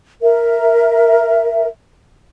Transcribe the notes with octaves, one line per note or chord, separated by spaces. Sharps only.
A#4 E5